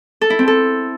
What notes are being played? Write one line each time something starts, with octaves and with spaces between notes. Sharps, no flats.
A4
E4
C4
A4